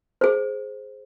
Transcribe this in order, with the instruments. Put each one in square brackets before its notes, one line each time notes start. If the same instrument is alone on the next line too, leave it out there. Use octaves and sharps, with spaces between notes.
[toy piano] G#4 C5